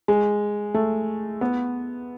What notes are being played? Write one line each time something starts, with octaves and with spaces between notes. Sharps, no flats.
G#3
A3
B3